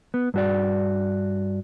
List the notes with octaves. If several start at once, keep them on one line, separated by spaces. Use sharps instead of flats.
B3
G2 F#4 D5